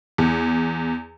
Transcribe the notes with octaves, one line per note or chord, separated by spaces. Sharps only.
E2